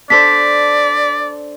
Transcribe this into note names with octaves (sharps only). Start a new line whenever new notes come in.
D4 A4 C5 D5 B6